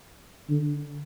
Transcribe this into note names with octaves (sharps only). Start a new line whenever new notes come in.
D3